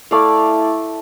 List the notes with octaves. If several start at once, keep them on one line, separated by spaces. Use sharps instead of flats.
A3 E4 D5 F5